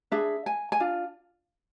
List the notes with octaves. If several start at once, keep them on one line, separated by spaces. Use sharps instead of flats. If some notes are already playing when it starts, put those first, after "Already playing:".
D4 G#4 B4 E5
G#5
G#5
D4 F4